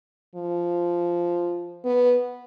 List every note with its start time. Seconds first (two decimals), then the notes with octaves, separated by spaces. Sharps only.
0.36 F3
1.85 B3